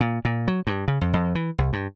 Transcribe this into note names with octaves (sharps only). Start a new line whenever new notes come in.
A#2
A#2
F#3
G2
C#3
F2
F2
E3
C2
G2